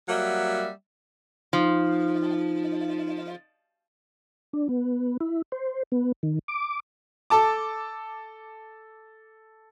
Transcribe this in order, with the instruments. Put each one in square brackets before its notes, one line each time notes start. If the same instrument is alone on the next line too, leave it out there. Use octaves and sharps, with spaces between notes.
[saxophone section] F#3 G3 A#3 E5 F#5
[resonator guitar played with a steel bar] F3 [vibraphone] D#4
[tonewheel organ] D4
B3
E4
C5
B3
D#3
D6
[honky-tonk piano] A4 A5 D6